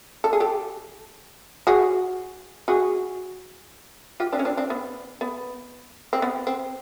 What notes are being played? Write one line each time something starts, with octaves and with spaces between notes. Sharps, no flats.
A4
G#4
G4 A4
F#4 G#4
F#4 G#4
F4 G4
C4 D4
C#4
C4 D4
C4 D4
B3
B3
C4
B3
C4